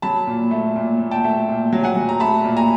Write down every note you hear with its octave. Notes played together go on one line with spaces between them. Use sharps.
F#3 A5 B5
A#2
A3
A#2
A#2
G5 A5
A3
A#2
F#3
F#5 G#5
F#3
A#5
A3 A5 B5
A#2
G#5 A#5